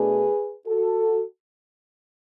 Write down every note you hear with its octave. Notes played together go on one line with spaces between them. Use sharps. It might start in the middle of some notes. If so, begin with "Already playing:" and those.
Already playing: B2 A3 D4 G#4 B4
F#4 A4